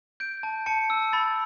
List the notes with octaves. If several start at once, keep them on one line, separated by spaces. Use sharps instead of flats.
G6 D7
A5
A5 C#7
E6
B5 A6